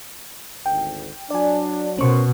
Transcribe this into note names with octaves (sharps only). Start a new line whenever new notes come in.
G#1 D2 G5
F#3 D4 D5 G#5
B2 C#4 A#4 C5 C#6